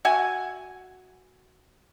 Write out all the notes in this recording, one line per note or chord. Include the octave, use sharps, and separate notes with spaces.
F#4 E5 F#5 G#5